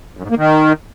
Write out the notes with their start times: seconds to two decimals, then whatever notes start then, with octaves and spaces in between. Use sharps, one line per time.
0.17 F#2
0.24 G#2
0.31 A#3
0.37 D#3